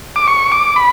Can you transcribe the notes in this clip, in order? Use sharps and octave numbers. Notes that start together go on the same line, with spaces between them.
D6
C#6
D6
B5